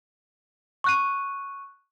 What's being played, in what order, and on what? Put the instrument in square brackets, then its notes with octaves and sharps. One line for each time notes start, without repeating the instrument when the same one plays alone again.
[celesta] C#6 F#6 D#7